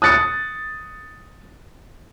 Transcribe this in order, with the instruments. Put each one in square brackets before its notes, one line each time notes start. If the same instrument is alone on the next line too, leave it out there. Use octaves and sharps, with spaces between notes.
[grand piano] D#6 F#6 A6 C#7